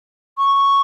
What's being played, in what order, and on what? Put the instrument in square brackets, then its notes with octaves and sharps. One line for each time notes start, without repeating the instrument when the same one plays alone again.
[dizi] C#6